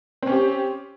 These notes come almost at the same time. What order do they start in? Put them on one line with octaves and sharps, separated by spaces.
C4 C#4 G4